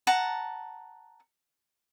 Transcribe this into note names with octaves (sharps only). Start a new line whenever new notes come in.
F#5 A5 A#5